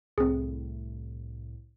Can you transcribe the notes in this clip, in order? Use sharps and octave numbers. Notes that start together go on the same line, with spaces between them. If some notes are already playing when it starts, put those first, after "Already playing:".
C2 A2 C4 G#4